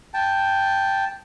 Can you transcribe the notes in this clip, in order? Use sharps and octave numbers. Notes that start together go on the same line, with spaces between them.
G5 A5